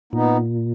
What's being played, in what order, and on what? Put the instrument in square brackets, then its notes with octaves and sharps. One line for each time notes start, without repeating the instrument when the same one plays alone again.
[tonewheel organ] A#2 [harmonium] B3 D#4